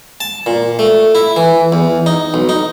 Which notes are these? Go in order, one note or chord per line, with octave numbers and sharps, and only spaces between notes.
A5
A#2
A3
E4
E3
E2
D#4
B1
D#4